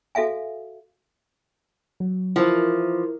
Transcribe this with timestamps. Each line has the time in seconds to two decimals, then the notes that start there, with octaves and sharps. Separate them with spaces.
0.15 F#4 A4 E5 F5 G#5
2.00 F#3
2.36 E3 F3 E4 A#4 C5